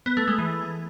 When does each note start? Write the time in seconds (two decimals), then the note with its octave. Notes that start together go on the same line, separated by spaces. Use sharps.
0.06 B3
0.17 A3
0.28 G#3
0.38 E3